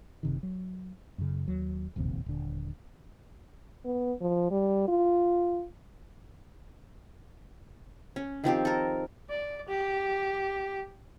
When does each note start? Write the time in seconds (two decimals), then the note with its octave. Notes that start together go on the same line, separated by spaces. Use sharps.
0.23 F#1 C3 D#3
0.43 F#3
1.18 F#2 C#3
1.48 D#2 F#3
1.96 E1 A#1 D#2 C3
2.26 D#1 D3
3.85 B3
4.21 F3
4.51 G3
4.88 F4
8.16 C#4
8.44 D#3 F3 C4 G4
8.65 A4 A#4
9.29 D5
9.68 G4